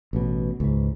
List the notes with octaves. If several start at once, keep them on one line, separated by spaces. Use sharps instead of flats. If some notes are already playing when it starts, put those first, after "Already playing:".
A1 B2
C#2 G#2